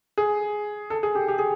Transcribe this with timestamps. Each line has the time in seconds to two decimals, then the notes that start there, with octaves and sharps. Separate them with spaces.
0.18 G#4
0.90 A4
1.03 G#4
1.15 G4
1.28 G4
1.39 G#4